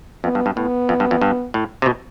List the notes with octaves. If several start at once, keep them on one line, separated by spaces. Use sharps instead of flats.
F2 B3
G2
G2
A2 B3
F2
G2
F2
G2
A2
C3
B2